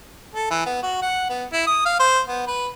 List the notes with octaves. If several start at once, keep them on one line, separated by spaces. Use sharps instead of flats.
A4
E3
B3
F#4
F#5
B3
E4
D#6
F5
C5
B3
B4